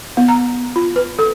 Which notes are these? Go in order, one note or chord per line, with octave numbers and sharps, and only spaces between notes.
B3
A#5
F4
B4
A4